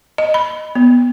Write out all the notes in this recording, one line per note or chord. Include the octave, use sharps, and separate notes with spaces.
D#5
B5
B3